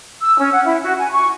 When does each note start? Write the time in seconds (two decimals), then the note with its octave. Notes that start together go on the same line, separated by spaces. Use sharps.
0.21 E6
0.38 C#4
0.52 F#5
0.65 E4
0.83 F#4
0.99 G#5
1.11 C#6